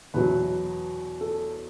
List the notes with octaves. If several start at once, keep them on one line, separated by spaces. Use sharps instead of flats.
E2 B2 F#3 B4
A4